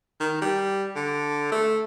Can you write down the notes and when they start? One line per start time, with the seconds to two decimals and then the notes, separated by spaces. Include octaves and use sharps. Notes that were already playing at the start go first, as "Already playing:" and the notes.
0.20 D#3
0.41 G3
0.96 D3
1.52 A3